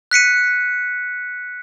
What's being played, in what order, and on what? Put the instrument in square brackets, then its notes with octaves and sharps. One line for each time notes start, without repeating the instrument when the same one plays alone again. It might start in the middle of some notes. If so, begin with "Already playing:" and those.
[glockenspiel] F#6 B6 C#7 D#7